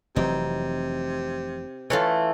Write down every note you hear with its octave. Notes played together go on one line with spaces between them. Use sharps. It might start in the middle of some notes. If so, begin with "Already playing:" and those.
F1 C3 E3 F#3 D#4
E3 A3 F4 A4 C#5